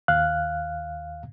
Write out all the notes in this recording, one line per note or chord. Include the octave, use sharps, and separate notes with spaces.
D#2 F5 F#6